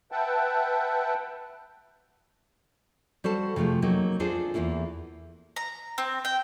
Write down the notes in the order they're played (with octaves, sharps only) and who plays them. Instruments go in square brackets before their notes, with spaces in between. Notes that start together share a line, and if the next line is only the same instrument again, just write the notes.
[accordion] B4 E5 F#5 G5 A5
[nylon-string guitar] G3 F#4 A4 C5 F#5 A5
C3 F3 A3 F4 G#4
F#3 A#3 C4 D#4
C4 D4 F4 G#4 A4 C5
E2 G2 A#3 E4 F4
[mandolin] A#5
C4
G5